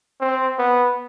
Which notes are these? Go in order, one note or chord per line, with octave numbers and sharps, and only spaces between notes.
C4
B3